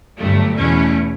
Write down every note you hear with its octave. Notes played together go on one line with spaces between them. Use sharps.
G1 G2 F#3 A3
E2 B2 A3 C#4